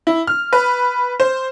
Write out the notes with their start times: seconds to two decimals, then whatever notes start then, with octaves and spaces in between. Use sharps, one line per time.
0.07 E4
0.27 F6
0.53 B4
1.20 C5